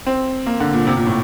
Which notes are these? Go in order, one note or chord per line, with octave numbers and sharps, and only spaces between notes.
C4
A#3
D3
A#2
C3
A#2
A2